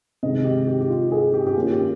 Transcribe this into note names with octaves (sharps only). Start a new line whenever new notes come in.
C3 D#3 G#3 D#5
G4
G4
G4
F4
G#4
G4
G4
D#3 A#3 C#4 F4
G4